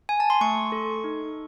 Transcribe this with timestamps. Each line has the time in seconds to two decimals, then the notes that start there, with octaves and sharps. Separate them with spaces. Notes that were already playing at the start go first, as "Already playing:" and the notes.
0.09 G#5
0.20 A5
0.30 C6
0.41 A3 C#6
0.72 A4
1.04 D#4